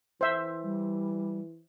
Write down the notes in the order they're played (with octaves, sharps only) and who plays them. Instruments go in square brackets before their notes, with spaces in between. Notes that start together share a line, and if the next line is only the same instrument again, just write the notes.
[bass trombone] E3 [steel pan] C5 E5
[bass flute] G3